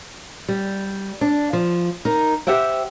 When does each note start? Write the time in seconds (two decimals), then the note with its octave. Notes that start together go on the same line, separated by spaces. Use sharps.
0.48 G3
1.21 D4
1.53 F3
2.05 D#4 A#4
2.47 G4 C5 E5 F#5 G5